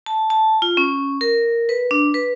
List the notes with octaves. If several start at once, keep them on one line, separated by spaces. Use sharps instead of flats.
A5
A5
F4
C#4
A#4
B4
D4
B4